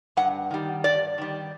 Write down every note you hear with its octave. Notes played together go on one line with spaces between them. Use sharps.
G2 F#5
D#3 G3
G2 D5
D#3 G3